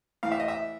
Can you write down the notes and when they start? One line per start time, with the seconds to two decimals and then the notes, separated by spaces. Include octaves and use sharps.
0.23 A2 E3 F5
0.31 E5
0.40 D#5
0.48 E5